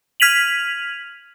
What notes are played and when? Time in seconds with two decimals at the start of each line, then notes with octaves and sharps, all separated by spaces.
0.20 F6 G#6 B6 D#7 F7 F#7